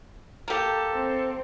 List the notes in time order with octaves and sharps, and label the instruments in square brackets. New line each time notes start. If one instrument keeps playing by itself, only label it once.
[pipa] A#3 G4 [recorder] A4
[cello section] C4